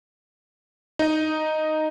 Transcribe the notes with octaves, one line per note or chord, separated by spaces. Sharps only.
D#4 D#5